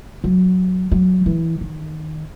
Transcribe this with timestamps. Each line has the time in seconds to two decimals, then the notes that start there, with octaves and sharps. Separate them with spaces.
0.24 F#3
0.92 F#3
1.26 E3
1.61 D#3